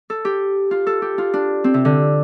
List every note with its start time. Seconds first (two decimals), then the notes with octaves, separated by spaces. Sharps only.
0.10 A4
0.25 G4
0.71 F4
0.87 A4
1.02 G4
1.18 F4
1.34 D4
1.64 C4
1.74 C3
1.85 D3